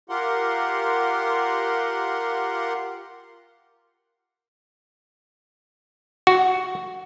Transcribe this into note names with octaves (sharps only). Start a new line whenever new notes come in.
F4 G4 A#4 F#5 C6
F#4